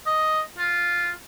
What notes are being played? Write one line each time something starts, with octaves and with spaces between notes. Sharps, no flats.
D#5
F4